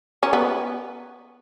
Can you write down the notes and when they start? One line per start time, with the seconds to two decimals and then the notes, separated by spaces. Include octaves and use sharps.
0.23 C#4
0.33 B3